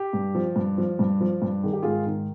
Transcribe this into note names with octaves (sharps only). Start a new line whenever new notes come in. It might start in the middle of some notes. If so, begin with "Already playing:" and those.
Already playing: G4
G2
F3
G2
F3
G2
F3
G2
D#3 G#4
G4
G#2 F4 G#4
D#3